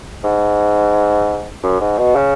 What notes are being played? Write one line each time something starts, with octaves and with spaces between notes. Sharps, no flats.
G#2
F#2
G#2
B2
C#3